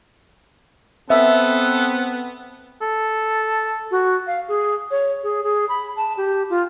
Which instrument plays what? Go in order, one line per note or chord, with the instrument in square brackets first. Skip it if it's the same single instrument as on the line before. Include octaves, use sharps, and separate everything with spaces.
[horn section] B3 [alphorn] C4 [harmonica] A4 [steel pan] E5
[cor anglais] A4
[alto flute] F#4
F5
G#4
C#5
G#4
G#4
B5
A5
G4
F4